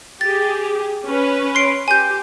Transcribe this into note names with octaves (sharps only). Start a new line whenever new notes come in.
G4 G#4 A6
C#4 B4
C6 C7 D7
G4 G#5 G6